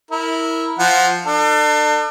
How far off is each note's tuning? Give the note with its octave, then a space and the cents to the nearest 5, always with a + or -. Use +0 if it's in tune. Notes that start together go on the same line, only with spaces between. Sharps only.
E4 -15 A#4 -10
F3 +0 F#5 +0
D4 +40 A4 +35